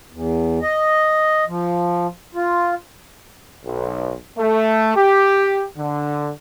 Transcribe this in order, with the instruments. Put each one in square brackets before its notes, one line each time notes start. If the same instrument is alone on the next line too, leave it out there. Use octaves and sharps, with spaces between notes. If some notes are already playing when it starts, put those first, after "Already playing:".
[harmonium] E2
D#5
F3
F4
[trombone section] B1
A3
G4
D3